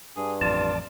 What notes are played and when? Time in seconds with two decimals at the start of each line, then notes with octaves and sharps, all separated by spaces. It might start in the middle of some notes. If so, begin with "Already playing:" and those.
0.17 G2 G#4
0.41 A1 F2 F4 D5 A5